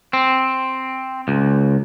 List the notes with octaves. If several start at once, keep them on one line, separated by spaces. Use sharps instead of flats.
C4
C#2